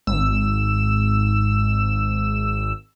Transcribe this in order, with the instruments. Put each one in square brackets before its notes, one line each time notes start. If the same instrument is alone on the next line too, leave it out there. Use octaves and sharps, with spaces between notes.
[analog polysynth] G#1 E6